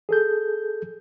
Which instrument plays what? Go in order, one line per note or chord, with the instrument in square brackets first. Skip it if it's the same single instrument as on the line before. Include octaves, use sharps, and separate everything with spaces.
[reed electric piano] G#4 A4 G6